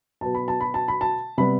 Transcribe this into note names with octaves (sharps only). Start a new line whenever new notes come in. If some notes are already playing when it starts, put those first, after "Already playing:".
B2 F#3 B3 A5
B5
A5
B5
A5
B5
A5
C3 G3 B3 B5